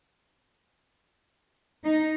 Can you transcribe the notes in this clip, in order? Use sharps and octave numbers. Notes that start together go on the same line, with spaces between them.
D#4